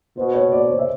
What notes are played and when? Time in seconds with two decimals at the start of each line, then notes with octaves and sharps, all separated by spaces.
0.17 B2 C5
0.34 C#5
0.52 D5
0.61 C#5
0.69 C5
0.79 E5